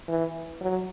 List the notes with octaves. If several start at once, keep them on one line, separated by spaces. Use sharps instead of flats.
E3
F#3